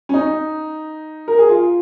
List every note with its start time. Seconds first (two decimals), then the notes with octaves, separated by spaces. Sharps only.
0.09 C#4
0.14 D#4
1.28 A#4
1.39 G#4
1.49 F4